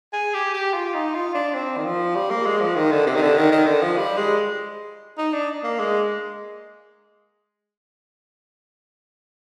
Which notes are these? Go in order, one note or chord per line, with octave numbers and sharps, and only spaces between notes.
G#4
G4
G4
F4
D#4
F4
D4
C4
D#3
F3
G3
A#3
G#3
F3
D#3
D3
C3
D#3
D3
D#3
D#3
D3
F3
G3
G#3
D#4
D4
A#3
G#3